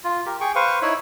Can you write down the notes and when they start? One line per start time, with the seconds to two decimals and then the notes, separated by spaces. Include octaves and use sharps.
0.04 F4
0.26 G4 A#4
0.41 G#4 G5 C#6
0.55 B4 C5 F5 C#6
0.82 D#4 E4 C#5 E5